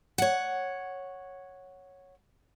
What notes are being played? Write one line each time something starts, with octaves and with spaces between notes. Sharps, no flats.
C#5 F#5